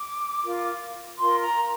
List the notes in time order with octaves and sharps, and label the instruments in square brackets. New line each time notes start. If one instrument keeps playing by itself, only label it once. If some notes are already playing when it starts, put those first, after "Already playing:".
Already playing: [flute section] D6
F4 A#4
F4 A#4 C6
A#5